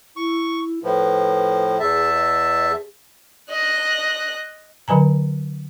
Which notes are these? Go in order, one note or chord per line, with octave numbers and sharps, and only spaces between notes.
E4 C#6
A2 F3 B4
E2 G#4 E5 A5
D#5
G#4
D#5 F#6
D3 F#3 B4 G#5 A#5